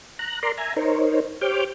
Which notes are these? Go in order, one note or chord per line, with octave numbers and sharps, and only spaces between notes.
A#5 F#6
A#4 D5 A#5 C6
E5 G#5 A#5
D#4 A#4 C5 C#5
G4 C5 C#5 D6 F6 G6